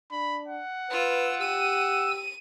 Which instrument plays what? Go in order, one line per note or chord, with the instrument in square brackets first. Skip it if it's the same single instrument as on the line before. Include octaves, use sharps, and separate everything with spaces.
[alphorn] D4 [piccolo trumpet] B5
[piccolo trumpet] F#5
[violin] F4 E6 [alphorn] B4
[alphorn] G4 [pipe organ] E6 [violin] D#7